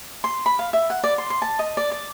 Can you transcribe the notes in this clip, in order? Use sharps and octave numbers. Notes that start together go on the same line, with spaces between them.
C6
B5
F5
E5
F#5
D5
C6
C6
A5
D#5
D5
D5